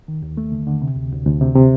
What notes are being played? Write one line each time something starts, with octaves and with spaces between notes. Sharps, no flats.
D#3
D#2
A3
D3
D3
C3
D2
D2
D2
C3
C3